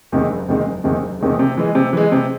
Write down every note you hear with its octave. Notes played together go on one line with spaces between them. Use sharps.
E2 C3 D#3 G#3
F#1
E2 C3 D#3 G#3
F#1
E2 C3 D#3 G#3
F#1
E2 C3 D#3 G#3
C3
E3 G#3
C3
E3 G#3
C3